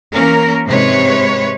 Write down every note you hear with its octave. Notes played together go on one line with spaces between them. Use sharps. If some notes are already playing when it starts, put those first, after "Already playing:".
E3 A#3 C#4 A#4
G#2 C3 B4 C#5